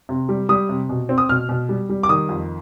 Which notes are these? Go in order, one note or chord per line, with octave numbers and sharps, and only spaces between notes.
C3
G3
G3 D#6
C3
B2
C4
D#6
B2 F6
B2
G3
G3
D6
D#3 D#6
F2